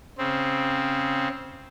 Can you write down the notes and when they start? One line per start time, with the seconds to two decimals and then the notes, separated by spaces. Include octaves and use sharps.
0.18 C#3 C4